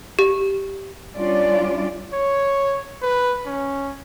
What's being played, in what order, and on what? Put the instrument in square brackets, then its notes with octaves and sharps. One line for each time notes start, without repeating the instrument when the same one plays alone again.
[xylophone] G4
[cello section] G3 C#4 D4 F4 D5
[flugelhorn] C#5
B4
C#4